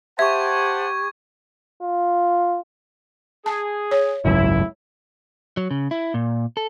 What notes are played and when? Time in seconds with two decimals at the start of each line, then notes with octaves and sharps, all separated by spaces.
0.19 G4 C5 E5 F#5 A5 C#6 G#6
1.81 F4
3.46 G#4 A5
3.91 C#5
4.25 G#1 C#2 F#2 E4
5.57 F#3
5.71 C#3
5.91 E4
6.14 A#2
6.57 A4